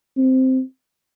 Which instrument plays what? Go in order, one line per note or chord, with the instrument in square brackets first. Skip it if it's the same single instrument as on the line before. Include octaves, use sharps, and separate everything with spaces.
[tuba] C4